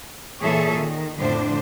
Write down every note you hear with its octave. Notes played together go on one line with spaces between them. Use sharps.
A#2 E3 G#4 A4 C#5 E5
D#3
F2 A2 D3 D4 C5